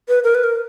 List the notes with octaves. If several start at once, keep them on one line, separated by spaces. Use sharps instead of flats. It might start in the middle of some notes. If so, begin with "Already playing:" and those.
B4
A#4
B4
A#4